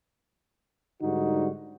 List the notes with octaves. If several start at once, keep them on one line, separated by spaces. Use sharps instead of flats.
G#2 D3 G3 D#4 F#4